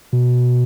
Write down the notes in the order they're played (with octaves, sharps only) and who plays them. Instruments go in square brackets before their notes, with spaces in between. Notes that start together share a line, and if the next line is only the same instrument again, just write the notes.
[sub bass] B2